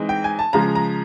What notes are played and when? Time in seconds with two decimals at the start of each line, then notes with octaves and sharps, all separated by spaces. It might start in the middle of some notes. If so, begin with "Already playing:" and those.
Already playing: E3 G#3 C4 D#4
0.09 G5
0.24 G#5
0.39 A5
0.53 C#3 F3 G#3 A#5
0.75 A#5